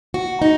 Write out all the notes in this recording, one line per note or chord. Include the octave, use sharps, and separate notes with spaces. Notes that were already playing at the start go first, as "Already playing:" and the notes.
F#4
D#4